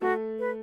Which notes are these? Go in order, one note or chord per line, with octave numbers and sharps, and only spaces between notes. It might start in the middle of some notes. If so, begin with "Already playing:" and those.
A3 F#4 A4
B4